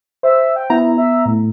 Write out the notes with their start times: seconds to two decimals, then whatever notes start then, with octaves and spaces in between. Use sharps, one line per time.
0.23 C5 E5
0.56 G5
0.70 B3 E4 A#5
0.98 E5
1.26 A2